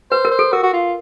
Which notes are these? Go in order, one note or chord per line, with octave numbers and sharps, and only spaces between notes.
B4 C5
A#4
C5
A4
F#4 A#4
F#4
F4